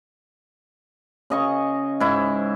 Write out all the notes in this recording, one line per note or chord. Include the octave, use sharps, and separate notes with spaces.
C#3 D#5 C#6
G#2 E4